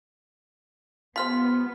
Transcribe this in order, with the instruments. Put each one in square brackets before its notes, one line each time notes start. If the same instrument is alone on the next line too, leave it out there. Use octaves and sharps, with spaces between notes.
[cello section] B3 [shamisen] F4 G4 C5 [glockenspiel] F6 B6